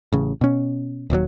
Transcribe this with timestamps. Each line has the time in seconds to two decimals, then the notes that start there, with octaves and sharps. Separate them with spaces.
0.13 A1 C#3
0.41 B2 C#4
1.10 D#1 D#2 E3 F#3